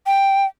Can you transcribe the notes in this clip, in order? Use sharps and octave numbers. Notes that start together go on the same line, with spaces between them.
G5